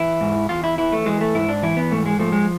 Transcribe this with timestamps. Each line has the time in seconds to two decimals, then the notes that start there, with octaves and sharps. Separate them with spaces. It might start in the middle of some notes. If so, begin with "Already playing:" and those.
Already playing: E3 E4
0.21 G#2
0.49 E2 F4
0.64 E4
0.78 E3 E4
0.92 A3
1.06 E3 G#3
1.21 A3
1.34 G#2 E4
1.49 D4
1.63 E3 E4
1.77 B3
1.91 G#2 A3
2.06 G#3
2.19 F3 A3
2.32 G#3